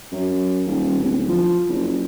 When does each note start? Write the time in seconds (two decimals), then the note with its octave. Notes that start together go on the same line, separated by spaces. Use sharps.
0.12 F#2
0.66 D#1
1.00 D1
1.29 F3
1.68 F#1